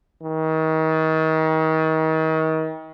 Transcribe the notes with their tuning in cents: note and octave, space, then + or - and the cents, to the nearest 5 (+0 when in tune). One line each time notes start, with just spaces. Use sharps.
D#3 +35